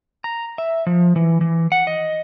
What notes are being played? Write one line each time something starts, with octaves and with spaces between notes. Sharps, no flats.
A#5
E5
F3
E3
E3
F#5
D#5